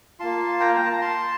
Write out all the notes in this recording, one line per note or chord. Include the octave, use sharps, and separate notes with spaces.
A#3 F4 A5 C6
G5 A#5
F5
G5
A5
A#5
A5 C6